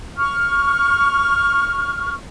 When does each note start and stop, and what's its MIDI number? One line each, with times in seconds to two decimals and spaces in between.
0.17 2.14 85
0.17 2.14 89